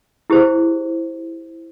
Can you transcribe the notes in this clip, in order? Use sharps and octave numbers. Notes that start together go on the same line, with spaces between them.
E4 G4 G#4 C5